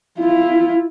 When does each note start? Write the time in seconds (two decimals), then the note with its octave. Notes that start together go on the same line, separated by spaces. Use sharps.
0.19 E4 F4